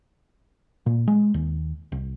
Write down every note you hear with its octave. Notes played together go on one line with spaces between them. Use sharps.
A#2
G#3
D#2
C2